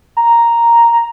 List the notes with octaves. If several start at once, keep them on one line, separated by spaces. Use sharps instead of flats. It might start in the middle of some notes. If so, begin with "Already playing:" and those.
A#5